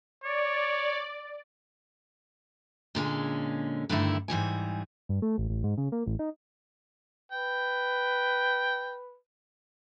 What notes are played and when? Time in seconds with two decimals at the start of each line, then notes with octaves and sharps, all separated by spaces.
0.24 C#5 D5
2.95 A#2 D3 G#3 C#4
3.89 G2 D3 D#3 A3 E4
4.28 G#2 E3 G3 G#5
5.09 G2
5.22 A3
5.38 A1
5.50 A1
5.64 G#2
5.78 C#3
5.92 A#3
6.06 A1
6.19 D#4
7.32 B4 G5